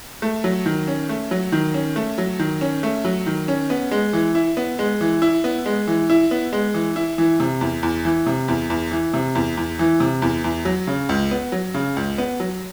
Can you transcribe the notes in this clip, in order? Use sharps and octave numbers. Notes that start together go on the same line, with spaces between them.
A3
F#3
D#3
C#4
A3
F#3
D#3
C#4
A3
F#3
D#3
C#4
A3
F#3
D#3
C#4
B3
G#3
E3
E4
B3
G#3
E3
E4
B3
G#3
E3
E4
B3
G#3
E3
E4
E3
C3
E2
E2
E3
C3
E2
E2
E3
C3
E2
E2
E3
C3
E2
E2
F#3
C#3
C#2
B3
F#3
C#3
C#2
B3
F#3